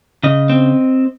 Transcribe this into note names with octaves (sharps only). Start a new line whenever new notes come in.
C#3 D#5
C4